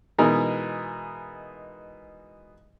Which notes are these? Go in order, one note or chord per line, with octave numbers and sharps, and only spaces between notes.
B2 E3 G#3 D#4 A#4